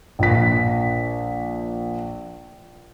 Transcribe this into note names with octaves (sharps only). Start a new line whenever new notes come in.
A#1 B6